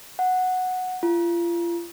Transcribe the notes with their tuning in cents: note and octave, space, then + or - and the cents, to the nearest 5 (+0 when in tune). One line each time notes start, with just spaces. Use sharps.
F#5 -5
F4 -35